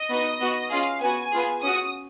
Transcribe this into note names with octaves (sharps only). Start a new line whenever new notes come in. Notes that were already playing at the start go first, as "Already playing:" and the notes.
Already playing: D#5
B3 D#4 F#4
B3 F#4
C#4 F4 G#4 F5
B3 F#4 G#5
B3 F4 G#4
C#4 F#4 D#6